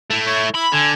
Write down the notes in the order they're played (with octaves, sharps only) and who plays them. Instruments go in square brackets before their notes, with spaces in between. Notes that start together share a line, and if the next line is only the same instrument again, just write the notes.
[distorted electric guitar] A3 E4
[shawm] C#5
[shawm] E4 [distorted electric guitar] B5
[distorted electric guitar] D3 [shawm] G#5